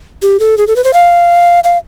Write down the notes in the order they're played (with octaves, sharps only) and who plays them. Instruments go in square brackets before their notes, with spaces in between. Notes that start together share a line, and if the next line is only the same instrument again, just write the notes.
[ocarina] G4
A4
G#4
A4
B4
C5
F5
F5